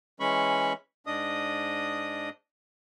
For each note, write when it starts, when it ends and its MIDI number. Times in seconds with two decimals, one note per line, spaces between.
0.20 0.73 52
0.20 0.73 56
0.20 0.73 61
0.20 0.73 83
0.20 0.73 85
1.07 2.29 44
1.07 2.29 62
1.07 2.29 75
1.07 2.29 87